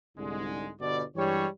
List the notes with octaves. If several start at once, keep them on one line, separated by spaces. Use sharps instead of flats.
C2 G#2 D3 G#3
G1 B2 D5
G2 E3 G3 G#3 G4 C#5